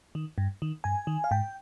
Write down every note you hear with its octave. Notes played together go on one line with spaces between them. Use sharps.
D#3
G2
D#3
G2 G#5
D#3
F5
G#2 G5